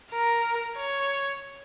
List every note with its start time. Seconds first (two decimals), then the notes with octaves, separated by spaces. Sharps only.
0.12 A#4
0.77 C#5